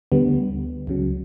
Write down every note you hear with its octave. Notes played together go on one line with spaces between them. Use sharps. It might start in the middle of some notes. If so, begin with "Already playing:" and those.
D2 D3 G3 B3
C#2 C#3 F#3